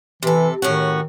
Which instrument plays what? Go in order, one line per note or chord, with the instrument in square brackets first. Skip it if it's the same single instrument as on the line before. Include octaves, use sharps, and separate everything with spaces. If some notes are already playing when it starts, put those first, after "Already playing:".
[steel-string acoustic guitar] C3 A4 [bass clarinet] E3
[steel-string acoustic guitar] A2 C#4 F#4 [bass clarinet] D#3